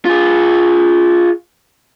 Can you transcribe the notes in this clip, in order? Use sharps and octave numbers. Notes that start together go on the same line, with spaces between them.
F4 G#4